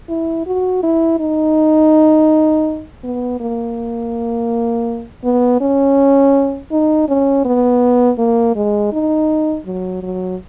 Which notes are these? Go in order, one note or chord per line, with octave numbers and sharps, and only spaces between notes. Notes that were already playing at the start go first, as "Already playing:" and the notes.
E4
F#4
E4
D#4
B3
A#3
B3
C#4
D#4
C#4
B3
A#3
G#3
D#4
F#3
F#3